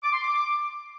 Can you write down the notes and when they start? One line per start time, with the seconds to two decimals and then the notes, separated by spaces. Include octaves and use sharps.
0.03 D6
0.13 C6
0.22 D6